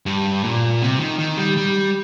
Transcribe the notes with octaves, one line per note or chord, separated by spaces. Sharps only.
G2
A#2
C3
D#3
D#3
G3
G3